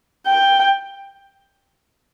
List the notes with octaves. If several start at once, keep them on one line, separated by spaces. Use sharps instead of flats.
G5